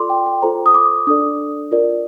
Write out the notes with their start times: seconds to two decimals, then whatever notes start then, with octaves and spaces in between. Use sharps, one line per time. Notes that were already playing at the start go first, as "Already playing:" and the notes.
Already playing: F4 A4 D5 C6 D6
0.10 G5
0.26 G5
0.42 F4 A4 C5 A#5
0.66 D#6
0.74 D6
1.07 D4 A4 D5 D#6
1.71 F4 A#4 D5